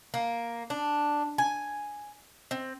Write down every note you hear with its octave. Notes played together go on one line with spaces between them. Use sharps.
A#3
D4
G#5
C4